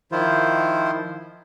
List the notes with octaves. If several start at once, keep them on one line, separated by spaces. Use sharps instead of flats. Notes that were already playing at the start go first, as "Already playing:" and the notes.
D#3 F3 E4 F4 C5